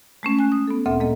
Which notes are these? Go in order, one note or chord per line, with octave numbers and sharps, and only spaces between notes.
G#3 A3 C#4
G#5 F#6
D#6
B3 A4
D2 A#2 C4 A4 E5
G#3 A#3 A4 D#5